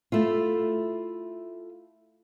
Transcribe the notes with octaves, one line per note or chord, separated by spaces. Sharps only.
A3 E4 F4